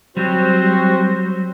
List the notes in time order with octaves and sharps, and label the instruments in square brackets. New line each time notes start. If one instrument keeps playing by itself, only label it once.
[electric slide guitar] F#3 G3 [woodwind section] C4 F#4 C5